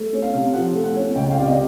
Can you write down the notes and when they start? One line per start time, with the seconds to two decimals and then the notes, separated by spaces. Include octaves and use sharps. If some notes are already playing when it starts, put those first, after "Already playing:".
Already playing: A3
0.13 C#4
0.22 F5
0.33 C3
0.53 F3 F#5
0.75 A3
0.84 F#5
0.95 C#4
1.15 C#2 G5
1.31 F5
1.35 C3 D5
1.46 D#5